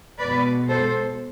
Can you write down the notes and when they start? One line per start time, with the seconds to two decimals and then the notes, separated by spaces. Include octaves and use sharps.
0.19 B2 G#3 B4 D5
0.68 A4 C5